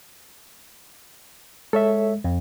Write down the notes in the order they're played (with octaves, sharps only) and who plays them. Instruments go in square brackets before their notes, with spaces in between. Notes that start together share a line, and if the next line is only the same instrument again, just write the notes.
[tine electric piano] G#3 [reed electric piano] A4 C#5 E5
[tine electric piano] F2